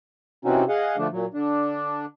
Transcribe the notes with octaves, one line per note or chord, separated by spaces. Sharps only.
C3 E3 C4 C#4 D#4 F#4
G#4 D#5 F5 F#5
D3 F3 A3 D4
A#2 F#3
D3 D4